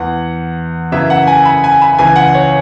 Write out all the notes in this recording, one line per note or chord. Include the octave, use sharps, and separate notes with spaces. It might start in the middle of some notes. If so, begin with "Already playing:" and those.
Already playing: E2 E3 F#5
F#2 C#3 E3 E5
F#5
G#5
B5
G#5
B5
C#2 C#3 E3 G#5
F#5
C#5